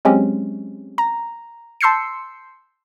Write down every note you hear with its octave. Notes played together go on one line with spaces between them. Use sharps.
F#3 G#3 C4 C#4 G4
A#5
A5 C6 E6 G6 C7 C#7